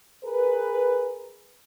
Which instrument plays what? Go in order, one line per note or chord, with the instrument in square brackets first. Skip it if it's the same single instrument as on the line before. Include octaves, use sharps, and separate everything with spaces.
[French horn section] G#4 A#4 B4